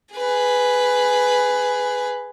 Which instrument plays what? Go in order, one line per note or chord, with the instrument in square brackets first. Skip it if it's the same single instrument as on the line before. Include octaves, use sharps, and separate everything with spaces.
[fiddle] G#4 B4